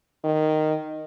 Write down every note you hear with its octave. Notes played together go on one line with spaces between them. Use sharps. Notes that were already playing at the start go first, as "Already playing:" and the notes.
D#3